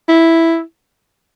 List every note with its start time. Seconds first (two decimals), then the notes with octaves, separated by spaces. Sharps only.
0.09 E4